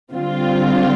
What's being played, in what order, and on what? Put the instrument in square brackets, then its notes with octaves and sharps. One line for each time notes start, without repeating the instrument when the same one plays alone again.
[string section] D3 G3 C4 F4